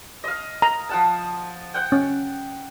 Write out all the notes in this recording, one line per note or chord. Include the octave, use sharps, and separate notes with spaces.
D#5 F5
A#5
F3 F#5 A5
F#5 G5
C#4